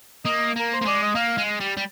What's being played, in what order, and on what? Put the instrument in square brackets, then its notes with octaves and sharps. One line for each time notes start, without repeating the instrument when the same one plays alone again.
[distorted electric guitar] A#3 [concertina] D#5
[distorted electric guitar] A#3 [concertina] A#4
[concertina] C5
[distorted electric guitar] A#3
[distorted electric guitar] G#3 [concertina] D5
[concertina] D#5
[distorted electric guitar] A#3 [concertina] F5
[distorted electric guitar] G#3
G3
G3